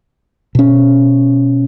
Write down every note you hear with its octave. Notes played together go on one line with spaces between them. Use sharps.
B2 C#4